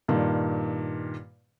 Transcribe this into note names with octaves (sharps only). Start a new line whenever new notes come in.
G2 A#2 D#3